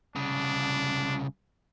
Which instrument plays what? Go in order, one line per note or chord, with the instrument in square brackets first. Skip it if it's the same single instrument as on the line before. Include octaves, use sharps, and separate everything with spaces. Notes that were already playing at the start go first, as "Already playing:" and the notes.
[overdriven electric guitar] C2 C#3 [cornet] D4